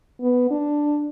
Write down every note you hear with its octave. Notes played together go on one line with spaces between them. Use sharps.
B3
D4